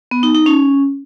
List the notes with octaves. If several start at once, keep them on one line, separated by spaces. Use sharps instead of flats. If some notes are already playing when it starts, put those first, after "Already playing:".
B3
D#4
D#4
C#4